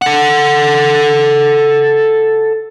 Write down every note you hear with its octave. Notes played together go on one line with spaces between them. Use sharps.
A4 F#5